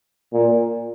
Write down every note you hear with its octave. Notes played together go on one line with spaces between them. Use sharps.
A#2